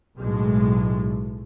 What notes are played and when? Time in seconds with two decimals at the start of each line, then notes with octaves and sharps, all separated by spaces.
0.17 B1 A2 G#3